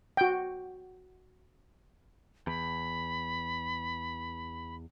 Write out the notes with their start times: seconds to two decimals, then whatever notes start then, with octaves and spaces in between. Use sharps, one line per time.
0.17 F#4 G5
2.47 E2 B5